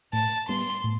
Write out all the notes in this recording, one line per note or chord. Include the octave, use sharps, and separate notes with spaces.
A2 A5
G3 B3 C6
A2